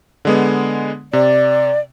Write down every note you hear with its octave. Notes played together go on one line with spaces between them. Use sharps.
D3 G#3 B3
C3 D5